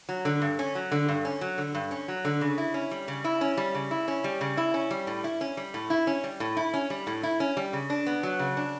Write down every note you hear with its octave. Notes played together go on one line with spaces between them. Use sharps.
F#3
D3
G2
C#4
F#3
D3
G2
C#4
F#3
D3
G2
C#4
F#3
D3
C#3
E4
C#4
G3
C#3
E4
C#4
G3
C#3
E4
C#4
G3
C#3
E4
C#4
G3
A2
E4
C#4
G3
A2
E4
C#4
G3
A2
E4
C#4
G3
A2
E4
C#4
G3
C#3
D4
B3
F#3
C#3
D4